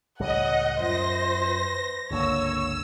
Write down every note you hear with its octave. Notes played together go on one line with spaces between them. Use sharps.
C#2 A2 G3 C#5 D#5 F#5
F#2 F4 C5 A#6
B4
G1 C#2 D3 A#3 C#5 E6